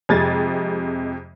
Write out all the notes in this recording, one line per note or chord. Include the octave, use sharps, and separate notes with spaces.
F2 C3 G#3 G#6 A6